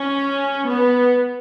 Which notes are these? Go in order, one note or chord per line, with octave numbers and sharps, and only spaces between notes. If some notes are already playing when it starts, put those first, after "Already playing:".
Already playing: C#4
B3